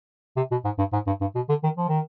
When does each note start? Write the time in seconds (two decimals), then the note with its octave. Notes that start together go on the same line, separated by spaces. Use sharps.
0.37 C3
0.51 B2
0.65 G#2
0.78 G2
0.93 G#2
1.07 G2
1.21 G2
1.35 B2
1.49 D3
1.64 D#3
1.77 F3
1.88 D#3